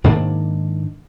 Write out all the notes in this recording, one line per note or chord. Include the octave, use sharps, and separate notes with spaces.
G#2 D#3 A#3 D4